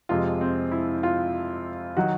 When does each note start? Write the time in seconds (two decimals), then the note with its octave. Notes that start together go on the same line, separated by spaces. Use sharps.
0.09 F2 C3 F3 G#3 F4
0.41 C4
0.72 E4
1.03 F4
1.97 D#3 F#3 F#4